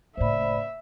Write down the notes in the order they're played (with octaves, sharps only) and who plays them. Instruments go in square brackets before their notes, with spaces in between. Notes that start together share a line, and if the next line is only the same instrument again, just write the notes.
[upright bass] F#1 A2 [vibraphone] C5 D5 B5 [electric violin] E5